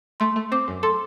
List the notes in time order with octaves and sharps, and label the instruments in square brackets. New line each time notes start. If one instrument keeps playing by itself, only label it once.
[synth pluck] A3 [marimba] C6
[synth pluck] A3
[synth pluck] C4 [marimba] D6
[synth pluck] F#2
[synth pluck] A4 [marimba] C6